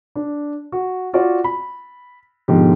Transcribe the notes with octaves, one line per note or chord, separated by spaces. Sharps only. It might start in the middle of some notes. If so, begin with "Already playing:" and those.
D4
F#4
F4 F#4 D5
B5
G#2 B2 D3 F3 G4